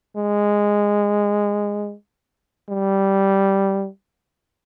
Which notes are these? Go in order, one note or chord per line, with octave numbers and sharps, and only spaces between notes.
G#3
G3